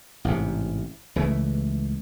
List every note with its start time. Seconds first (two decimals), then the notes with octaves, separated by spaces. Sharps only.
0.25 A1 G#2 C3
1.16 C#2 C#3 E3 A3